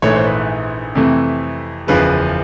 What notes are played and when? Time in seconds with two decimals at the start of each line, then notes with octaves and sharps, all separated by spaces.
0.02 A#1 G#2 E3 A3 C#5
0.16 C5
0.26 B4
0.95 F2 C3 E3 A3
1.87 F#1 E2 C#3 F3 G#3 B4